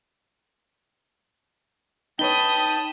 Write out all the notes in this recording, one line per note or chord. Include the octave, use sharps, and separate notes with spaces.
D#4 B4 C#5 G5 A5 B5 D#6 G7